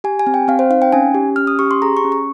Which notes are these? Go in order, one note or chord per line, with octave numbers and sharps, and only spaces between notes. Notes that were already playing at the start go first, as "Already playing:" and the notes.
G4 G#5
G#5
C4
G5
C4 F5
C5
D#4 F5
G5
C#4 G#5
G4
C#4 F6
D#6
G4 C#6
C6
G#4 A#5
C#6
C#4
C#6